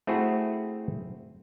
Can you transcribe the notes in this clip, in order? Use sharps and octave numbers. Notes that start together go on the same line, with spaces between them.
A3 C4 E4 F#4 G#4